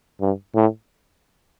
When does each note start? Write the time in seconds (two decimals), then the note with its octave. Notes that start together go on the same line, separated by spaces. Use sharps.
0.21 G2
0.56 A2